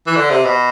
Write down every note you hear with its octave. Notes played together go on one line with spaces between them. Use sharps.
E3
D3
C3
B2